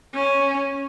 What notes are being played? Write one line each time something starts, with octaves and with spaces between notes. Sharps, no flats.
C#4